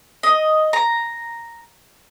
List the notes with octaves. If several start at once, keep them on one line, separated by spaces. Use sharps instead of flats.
D#5
A#5